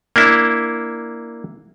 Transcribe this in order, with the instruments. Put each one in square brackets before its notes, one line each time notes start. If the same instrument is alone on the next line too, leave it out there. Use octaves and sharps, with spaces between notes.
[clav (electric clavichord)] A#3 D4 E4